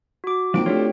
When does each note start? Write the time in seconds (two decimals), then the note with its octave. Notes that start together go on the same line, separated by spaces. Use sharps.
0.24 F#4 D6
0.54 D#2 F3 C4 D7
0.66 D2 F4 G4 A4 C#5